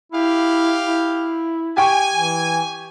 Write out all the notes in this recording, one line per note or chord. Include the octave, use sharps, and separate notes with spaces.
E4 G4 F5
E4
G4 G5 G#5 C#6
E3